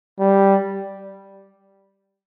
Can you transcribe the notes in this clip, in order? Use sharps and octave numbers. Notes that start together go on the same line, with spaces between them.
G3